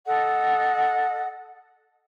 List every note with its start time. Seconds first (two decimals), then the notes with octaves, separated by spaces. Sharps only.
0.05 A4 D#5 F#5